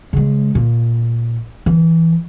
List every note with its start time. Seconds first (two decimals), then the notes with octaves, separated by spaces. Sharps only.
0.13 C#3 G#3
0.55 A#2
1.66 E3